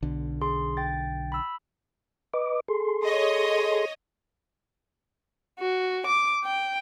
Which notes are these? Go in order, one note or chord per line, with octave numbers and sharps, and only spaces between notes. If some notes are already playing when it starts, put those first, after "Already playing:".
B1 D3
G#4 C6
G5 A6
B5 E6
B4 D#5 D6
G#4 A4 C6
C#5 D#5
F#4
D6
G5